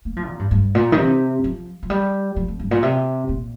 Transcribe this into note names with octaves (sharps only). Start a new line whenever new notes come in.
A#3
F3
A#2
G2
G2
A#2
D#3
C3
F3
F3
G3
F3
F2
G2
A#2
C3
A#2